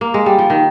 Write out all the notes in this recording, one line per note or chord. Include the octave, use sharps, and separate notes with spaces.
A#3
G#3
G3
F3
D#3